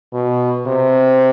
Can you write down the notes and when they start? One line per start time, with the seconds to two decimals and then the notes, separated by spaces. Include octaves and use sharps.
0.14 B2
0.67 C3